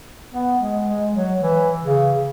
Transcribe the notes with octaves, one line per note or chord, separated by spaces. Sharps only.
B3
G#3
G#3
F#3
E3
C#3